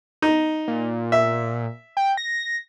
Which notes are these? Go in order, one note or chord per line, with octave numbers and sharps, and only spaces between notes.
D#4
A#2
E5
G5
A#6